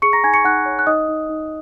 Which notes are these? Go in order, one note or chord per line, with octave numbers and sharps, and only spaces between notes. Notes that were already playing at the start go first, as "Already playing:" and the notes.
G#4 C#6 C#7
A#5 A#6
D#4 G#5 G#6
C#6 C#7
D#4 F#5 F#6
C#5
F#6
D#4 D#5 D#6
D#4
D#4